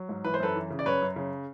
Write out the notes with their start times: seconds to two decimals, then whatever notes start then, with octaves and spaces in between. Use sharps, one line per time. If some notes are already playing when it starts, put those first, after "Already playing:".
Already playing: F#3
0.09 G#2
0.24 E3 B4
0.34 C5
0.40 F#2 A4 B4
0.55 E3
0.70 C#3
0.79 D5
0.86 F#2 B4 C#5
1.02 F#2
1.16 C#3